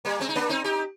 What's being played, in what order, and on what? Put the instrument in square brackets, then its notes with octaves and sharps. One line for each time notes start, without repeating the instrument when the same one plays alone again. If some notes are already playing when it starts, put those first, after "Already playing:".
[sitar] G3 A#3
G#3 C4
D#4
A#3 D4
C4 D#4
D#4 G4